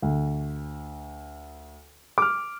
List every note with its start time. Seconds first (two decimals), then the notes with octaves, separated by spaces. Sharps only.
0.02 D2
2.18 D6 F6